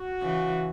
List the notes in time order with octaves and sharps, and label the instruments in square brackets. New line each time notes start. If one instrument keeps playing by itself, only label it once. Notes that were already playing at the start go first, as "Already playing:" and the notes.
Already playing: [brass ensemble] F#4
[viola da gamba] C#3 E3